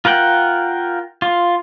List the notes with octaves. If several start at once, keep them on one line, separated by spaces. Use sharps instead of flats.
F4 A#4 F#5 G5
F4